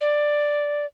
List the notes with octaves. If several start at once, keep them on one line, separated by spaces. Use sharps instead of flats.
D5